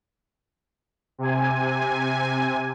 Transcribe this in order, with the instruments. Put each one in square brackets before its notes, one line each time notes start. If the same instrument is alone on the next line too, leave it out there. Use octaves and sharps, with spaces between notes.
[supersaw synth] C3 G#5